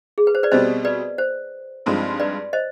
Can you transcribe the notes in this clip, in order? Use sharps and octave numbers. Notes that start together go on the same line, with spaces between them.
G#4
B4
C5
B4 D5
B2 G3 C4 C5 D#5
B4 D5
C5
G2 F3 G#3 C4 D#4
B4 D5
C5 D#5